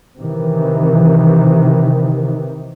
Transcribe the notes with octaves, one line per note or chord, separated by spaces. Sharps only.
C3 D#3 E3